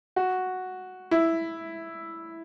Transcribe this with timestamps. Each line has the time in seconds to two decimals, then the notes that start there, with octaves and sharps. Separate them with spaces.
0.16 F#4
1.11 E4